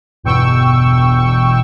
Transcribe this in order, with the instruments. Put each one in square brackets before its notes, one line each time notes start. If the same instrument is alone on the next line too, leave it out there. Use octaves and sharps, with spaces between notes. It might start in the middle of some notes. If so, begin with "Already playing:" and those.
[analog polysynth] G1 E2 B2 G5 C#6 E6